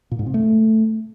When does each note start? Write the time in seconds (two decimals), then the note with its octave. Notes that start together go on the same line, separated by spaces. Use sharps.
0.11 A#2
0.19 G#2
0.27 C3
0.34 A3